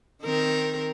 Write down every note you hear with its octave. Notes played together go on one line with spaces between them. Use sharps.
D#3 C4 A#4